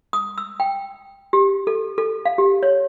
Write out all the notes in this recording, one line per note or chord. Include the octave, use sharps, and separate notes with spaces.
D#6
E6
G5
G4
A4
A4
F5
G4
C#5